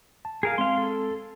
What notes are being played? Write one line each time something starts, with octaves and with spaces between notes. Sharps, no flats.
A5
G#4 A#4 F5
G#3 C4 F5 C6
A4